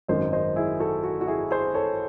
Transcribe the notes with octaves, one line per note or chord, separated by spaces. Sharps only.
G#1 F#2 D#3 C5 D#5
C5 D#5
E4 G#4
F#4 A4
F#4
F#4
E4 G#4
G#4 C5
A4 C#5